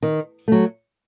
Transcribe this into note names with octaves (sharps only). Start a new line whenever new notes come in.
D#3
F#3 A3